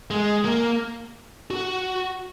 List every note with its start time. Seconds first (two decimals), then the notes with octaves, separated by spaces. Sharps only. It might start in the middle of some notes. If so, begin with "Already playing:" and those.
0.10 G#3
0.45 A#3
1.50 F#4